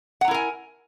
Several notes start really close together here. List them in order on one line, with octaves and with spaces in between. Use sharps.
F#5 A#5 E4 A#4 G#5